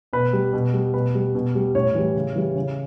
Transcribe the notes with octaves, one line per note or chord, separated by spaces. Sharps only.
B2 B4
G3
B2
G3
B2 B4
G3
B2
G3
A2 C#5
E3 G3
C#3
E3 G3
C#3